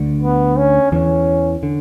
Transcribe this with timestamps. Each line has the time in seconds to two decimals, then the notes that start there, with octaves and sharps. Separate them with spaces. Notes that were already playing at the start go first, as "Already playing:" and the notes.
Already playing: D2 D3
0.22 B3
0.57 C#4
0.92 E2 E3 C#4
1.63 D3